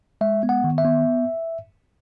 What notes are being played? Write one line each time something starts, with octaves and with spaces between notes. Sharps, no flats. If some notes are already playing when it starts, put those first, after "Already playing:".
G#3 E5
B3
F#5
D#3
E5
B3